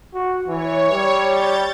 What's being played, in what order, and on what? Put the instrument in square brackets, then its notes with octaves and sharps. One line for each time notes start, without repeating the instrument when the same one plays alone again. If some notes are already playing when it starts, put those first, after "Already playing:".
[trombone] F#4
[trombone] E3 [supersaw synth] C#5
[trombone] G3
[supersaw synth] G6 A6